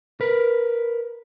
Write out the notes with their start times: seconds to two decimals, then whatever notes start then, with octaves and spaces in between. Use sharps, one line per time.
0.21 A#4 B4